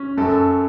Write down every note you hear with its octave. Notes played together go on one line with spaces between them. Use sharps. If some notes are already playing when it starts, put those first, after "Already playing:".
Already playing: C#4
F#2 A4